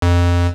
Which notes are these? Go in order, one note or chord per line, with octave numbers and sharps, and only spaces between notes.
F2